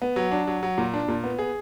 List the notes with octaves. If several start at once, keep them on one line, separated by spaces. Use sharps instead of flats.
B3
F#3
D4
F#3
F#3
A#2
D4
A#2
B3
G#4